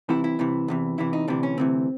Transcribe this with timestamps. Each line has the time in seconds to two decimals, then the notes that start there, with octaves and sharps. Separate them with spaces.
0.09 C2 C3 E3 E4
0.24 E4
0.39 C2 C3 E3
0.68 E2 C3 E3
0.98 E2 C3 E3 E4
1.13 D#4
1.28 D2 C3 E3 D4
1.43 C#4
1.58 D2 C3 E3 C4